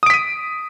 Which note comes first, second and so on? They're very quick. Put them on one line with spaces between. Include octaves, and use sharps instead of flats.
D#6 D7 B6 D#7